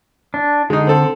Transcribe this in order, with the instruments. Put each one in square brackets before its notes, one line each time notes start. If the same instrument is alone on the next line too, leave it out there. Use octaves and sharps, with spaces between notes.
[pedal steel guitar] D4
[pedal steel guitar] D3 [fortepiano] G#3 D#4
[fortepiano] C4 A4